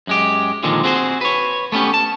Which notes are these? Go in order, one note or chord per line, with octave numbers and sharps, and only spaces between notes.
F#2 G#3 G4
A#2 D3 D#3 F3 G#3
C4 F#4 G#4 B4 C5
B4 C#5
A3 B3 C#4 G4
A5